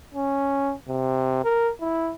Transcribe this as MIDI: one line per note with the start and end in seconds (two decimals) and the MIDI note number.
0.14 0.73 61
0.89 1.42 48
1.44 1.71 70
1.81 2.13 64